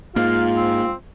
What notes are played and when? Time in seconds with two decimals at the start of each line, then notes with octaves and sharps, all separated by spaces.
0.16 G#2 A#3 F4 F5
0.57 C4